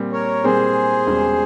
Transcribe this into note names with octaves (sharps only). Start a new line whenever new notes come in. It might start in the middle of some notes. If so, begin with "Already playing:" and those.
Already playing: A#2 G3 C4
A#4 C#5
A#2 G3 C4 G#4 C5
E1 E2 C#3 G3